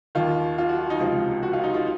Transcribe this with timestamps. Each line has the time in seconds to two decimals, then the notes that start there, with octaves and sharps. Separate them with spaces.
0.15 D#2 D#3 F4
0.58 F4
0.69 F#4
0.79 F4
0.90 D#4
1.00 C#2 C3 F3 F4
1.43 F#4
1.53 F4
1.64 D#4
1.74 F4